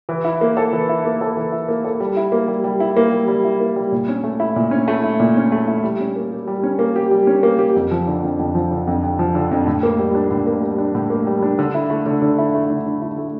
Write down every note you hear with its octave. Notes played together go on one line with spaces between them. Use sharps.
E3
E4
A#3
A4
E3
E4
A#3
A4
E3
E4
A#3
A4
G3
E4
A#3
G3
G3
E4
A#3
G3
G3
E4
A#3
G3
A#2
C#4
A3
E4
A#2
C#4
A3
E4
A#2
C#4
A3
E4
G3
C#4
A#3
G4
G3
C#4
A#3
G4
G3
C#4
A#3
G4
F2
F3
D3
F2
F2
F3
D3
F2
F2
F3
D3
F2
A2
A#3
G3
D4
A2
A#3
G3
D4
A2
A#3
G3
D4
D3
E4
A3
D3
D3
E4
A3
D3
D3
E4
A3